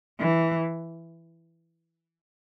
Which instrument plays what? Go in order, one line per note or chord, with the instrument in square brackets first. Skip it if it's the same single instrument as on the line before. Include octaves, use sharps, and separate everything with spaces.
[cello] E3